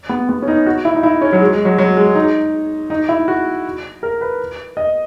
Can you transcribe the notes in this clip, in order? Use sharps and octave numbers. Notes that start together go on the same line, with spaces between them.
B3
B3
C#4
D#4
F#4
E4
D#4
E4
C#4
F#3
G#3
G#3
F#3
F#3
G#3
D#4
D#4
E4
F#4
A#4
B4
D#5